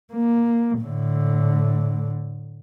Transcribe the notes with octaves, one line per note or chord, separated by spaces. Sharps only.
A#3
A2 D3